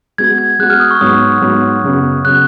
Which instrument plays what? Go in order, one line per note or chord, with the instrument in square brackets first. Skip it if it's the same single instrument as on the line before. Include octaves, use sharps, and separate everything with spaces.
[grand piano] G#3 B3 F#4 [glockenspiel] G#6
[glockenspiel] G#6
[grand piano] G#3 B3 F#4 [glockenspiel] F#6
[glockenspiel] F6
D#6
C#6
[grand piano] G#2 F#3 B3 [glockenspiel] D#6
[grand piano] G#2 F#3 B3
F#2 C#3 F#3 B3
[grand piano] C#3 F#3 B3 [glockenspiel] F#6